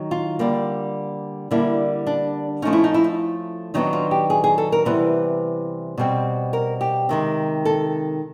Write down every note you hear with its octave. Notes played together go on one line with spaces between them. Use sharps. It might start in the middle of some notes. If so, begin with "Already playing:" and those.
Already playing: D#3 F#3
F4
D3 G3 A#3
D3 G3 A#3 E4
D4
F3 A3 C#4 D#4
E4
D#4
E4
D#4
D#3 F#3 B3 D4 D#4
F4
G4
G#4
G#4
A4
A#4
C3 E3 G3 B3 B4
B2 G3 C4
A#4
G4
C3 D#3 G#3
A4